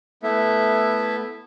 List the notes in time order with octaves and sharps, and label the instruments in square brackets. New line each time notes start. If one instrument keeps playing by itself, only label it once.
[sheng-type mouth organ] A3 B3 E4 E5